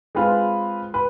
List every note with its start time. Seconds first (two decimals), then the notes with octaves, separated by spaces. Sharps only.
0.15 G#3 C4 F4 B4
0.94 B4